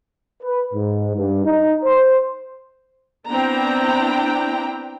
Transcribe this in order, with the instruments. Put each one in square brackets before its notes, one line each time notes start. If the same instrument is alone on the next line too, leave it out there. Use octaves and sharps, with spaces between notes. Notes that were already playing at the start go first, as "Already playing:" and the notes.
[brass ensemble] B4
G#2
G2
D#4
C5
[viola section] B3 C4 D4 E4 G5 A#5